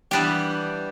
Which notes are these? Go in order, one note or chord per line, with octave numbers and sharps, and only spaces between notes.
E3 G3 B3 D4 G4